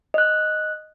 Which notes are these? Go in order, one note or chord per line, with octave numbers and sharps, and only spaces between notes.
D#5 F#6